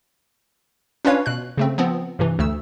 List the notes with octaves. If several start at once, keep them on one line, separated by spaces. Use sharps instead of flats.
C#4 D4 F4 B4 C#5 F5
B2 F#6
C#3 A3 C4
F3 B3 C4
G2 C3 E3
D2 A3 E6